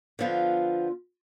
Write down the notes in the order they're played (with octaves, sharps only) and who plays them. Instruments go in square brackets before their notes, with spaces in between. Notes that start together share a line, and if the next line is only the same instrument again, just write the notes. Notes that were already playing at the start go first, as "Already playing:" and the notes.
[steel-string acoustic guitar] D3 F3 B3 F4